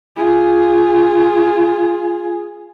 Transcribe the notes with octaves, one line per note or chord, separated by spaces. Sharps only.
F4 G#4